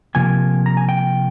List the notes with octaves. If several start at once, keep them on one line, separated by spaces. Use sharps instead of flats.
C3 F3 A#3 G#5
A#5
G#5
G5